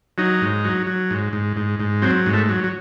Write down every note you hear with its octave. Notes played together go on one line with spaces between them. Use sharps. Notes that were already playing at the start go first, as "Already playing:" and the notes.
F#3 D#4
G#2
F#3
F#3
G#2
G#2
G#2
G#2
F#3 C4
G#2
A3
F#3
F#3